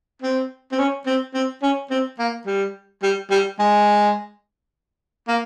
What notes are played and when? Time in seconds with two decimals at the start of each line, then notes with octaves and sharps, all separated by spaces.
0.22 C4
0.72 C4
0.79 C#4
1.06 C4
1.34 C4
1.63 C#4
1.91 C4
2.19 A#3
2.47 G3
3.03 G3
3.31 G3
3.59 G#3
5.28 A#3